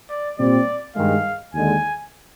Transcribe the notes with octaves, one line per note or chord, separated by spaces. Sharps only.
D5
A#2 G3 C4 D5
G2 D#3 G#3 F5
D#2 D3 G#3 G#5